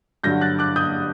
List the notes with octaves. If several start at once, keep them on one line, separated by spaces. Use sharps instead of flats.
G2 D3 F#3 G6 A#6
F#6 A6
D6 F#6
D#6 G6